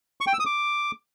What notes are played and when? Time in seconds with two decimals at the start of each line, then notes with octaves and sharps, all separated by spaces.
0.21 C#6
0.27 G5
0.33 E6
0.40 D#6
0.46 D6